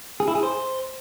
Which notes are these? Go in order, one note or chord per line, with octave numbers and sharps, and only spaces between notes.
G#4
E4
G#4
C5